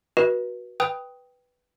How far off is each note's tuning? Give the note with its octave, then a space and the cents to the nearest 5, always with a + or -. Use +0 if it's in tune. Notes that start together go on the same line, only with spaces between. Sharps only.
F#4 +0 B4 -30 D#5 +0
B4 +0 G5 +0 D#6 +10